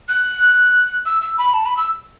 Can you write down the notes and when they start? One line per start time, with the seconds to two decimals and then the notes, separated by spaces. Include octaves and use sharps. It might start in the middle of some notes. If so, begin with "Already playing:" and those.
0.09 F#6
1.06 E6
1.21 E6
1.38 B5
1.54 A5
1.66 B5
1.77 E6